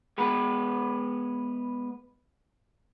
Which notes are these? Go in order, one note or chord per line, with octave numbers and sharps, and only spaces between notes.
G#3 B3 B4